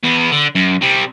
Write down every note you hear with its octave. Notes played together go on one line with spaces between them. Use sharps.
E2 B3
D3
F#2
C3 G3